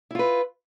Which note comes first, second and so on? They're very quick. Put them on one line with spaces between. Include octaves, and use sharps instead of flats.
E4 F4 B4